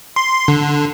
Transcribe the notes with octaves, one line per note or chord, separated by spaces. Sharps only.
C6
D3